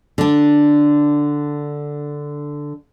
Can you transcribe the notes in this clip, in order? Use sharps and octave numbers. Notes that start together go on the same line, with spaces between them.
D3 D4